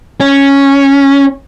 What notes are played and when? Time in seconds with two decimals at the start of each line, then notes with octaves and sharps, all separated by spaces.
0.20 C#4